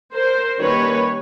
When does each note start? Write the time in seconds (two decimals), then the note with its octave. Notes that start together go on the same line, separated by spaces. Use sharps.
0.15 A#4 C5
0.60 D#3 G3 A#3 C#4 B4 C#5